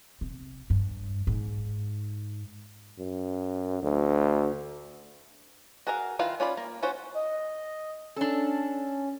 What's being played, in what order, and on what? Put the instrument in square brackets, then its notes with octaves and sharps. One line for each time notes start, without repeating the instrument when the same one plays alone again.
[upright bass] C3
G2
G#2
[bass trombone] F#2
D2
[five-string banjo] F#4 G#4 A#4 E5 F5
D#3 E4 F4 B4 F5
C#4 F4 D5 B5
A#3
C#4 F4 F#4 C5
[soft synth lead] D#5
[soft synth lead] C#4 [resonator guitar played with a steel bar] D4 A4